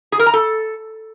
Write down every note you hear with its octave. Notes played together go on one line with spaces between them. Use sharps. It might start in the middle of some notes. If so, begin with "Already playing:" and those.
G#4
A#4
A#5
A4